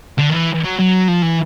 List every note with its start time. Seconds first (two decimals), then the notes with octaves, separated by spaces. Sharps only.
0.18 D3
0.29 D#3
0.33 E3
0.63 F#3
0.79 F#3
1.09 F3
1.23 E3